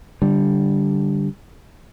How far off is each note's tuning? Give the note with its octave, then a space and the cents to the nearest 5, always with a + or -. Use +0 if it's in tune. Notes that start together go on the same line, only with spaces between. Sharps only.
D3 -5 G3 +0